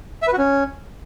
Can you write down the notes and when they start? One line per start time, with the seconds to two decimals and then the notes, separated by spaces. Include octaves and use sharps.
0.22 E5
0.28 B4
0.33 F#4
0.38 C#4